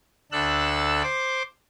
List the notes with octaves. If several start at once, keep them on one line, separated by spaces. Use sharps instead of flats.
D2 D4 A4 E6 F#6
C5 C6 D6